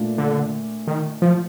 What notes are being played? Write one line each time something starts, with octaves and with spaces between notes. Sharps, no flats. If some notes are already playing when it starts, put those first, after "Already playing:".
Already playing: A#2 A3 D4 F4
D3
D#3
F3